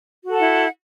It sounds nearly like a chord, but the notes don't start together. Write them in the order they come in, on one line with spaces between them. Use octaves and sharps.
F#4 A4 F#5 E4